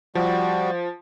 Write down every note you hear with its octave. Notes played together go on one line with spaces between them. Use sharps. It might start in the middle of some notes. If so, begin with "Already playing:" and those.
F3 G3 F#4